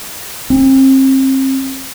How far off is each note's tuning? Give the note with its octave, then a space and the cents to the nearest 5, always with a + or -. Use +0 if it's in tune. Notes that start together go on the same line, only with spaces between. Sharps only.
C4 +35